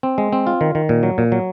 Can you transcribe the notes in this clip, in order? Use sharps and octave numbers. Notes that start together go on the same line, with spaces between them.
C4
G#3
C4
F4
D#3
D#3
A#2
F#3
A#2
F#3